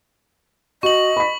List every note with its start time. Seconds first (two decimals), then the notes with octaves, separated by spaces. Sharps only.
0.83 F#4 D#5 C#6 F#7
1.17 B5 B6